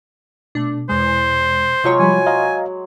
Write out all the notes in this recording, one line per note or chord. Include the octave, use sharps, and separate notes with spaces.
B2 A3 D4
E2 G#3 C5
C3 F#3 G#3 F4 C#5
F3 G3 G#5 B5
D#5 F5 A#5